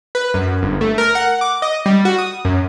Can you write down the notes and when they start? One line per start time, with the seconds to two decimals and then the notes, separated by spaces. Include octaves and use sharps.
0.15 B4
0.34 F#2
0.63 G1
0.81 A3
0.98 A#4
1.15 F#5
1.41 D6
1.62 D#5
1.86 G3
2.05 F#4
2.18 D#6
2.45 F#2